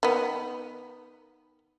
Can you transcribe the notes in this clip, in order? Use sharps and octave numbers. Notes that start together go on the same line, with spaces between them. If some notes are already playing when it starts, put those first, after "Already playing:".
D#3 B3